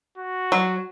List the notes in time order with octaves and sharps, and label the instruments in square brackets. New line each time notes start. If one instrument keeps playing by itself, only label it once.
[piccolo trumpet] F#4
[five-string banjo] F#3